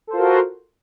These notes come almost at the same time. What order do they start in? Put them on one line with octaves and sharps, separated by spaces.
A4 C5 F4 A#4 F#4